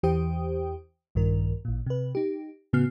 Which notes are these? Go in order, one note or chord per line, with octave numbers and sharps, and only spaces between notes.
E2 E3 G4 C5 G5 D#6
A#1 G2 D#3 A#4
A1 A#2
C3 B4
D#4 G4
A2 C#3 B3 F#4 F6 C7